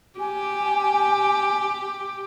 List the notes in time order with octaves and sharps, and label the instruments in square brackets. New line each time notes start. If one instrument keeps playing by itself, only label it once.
[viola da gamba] G4 [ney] G#5